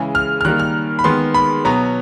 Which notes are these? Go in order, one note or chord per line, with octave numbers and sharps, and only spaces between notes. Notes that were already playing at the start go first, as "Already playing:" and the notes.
Already playing: C#3 E3 G#3
F6
F6
D#3 G3 A#3 F#6
F6
B5
D#3 G#3 B3 C6
B5
B2 F#3 B3 A#5